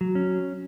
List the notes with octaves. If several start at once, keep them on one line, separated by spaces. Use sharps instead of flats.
F#3
C#4